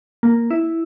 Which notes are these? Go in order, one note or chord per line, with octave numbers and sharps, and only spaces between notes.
A#3
E4